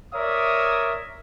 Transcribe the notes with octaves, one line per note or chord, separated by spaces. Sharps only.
A#4 C#5 D5 E5 D#6